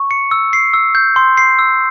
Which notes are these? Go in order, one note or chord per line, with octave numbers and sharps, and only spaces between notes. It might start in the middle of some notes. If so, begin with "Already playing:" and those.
Already playing: C#6
C#7
E6
C7
E6
G6
C6
C7
E6